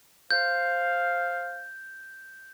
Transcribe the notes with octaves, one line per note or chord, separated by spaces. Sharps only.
C5 F5 G6